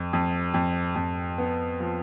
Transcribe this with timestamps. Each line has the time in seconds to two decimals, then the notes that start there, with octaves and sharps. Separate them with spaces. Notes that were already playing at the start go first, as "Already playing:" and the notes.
Already playing: F2
0.13 F2
0.54 F2
0.96 F2
1.38 B3
1.80 F3